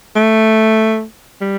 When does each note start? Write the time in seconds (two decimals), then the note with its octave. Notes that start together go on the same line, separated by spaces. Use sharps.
0.15 A3
1.41 G3